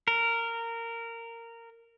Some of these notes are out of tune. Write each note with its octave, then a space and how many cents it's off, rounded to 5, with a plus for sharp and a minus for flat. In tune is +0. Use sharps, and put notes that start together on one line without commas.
A#4 -15